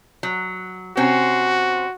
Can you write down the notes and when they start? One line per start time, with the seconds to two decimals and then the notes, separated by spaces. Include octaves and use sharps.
0.23 F#3
0.97 C3 C4 C#4 F#4